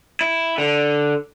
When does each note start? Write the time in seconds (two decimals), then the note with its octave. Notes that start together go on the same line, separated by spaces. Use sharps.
0.21 E4
0.58 D3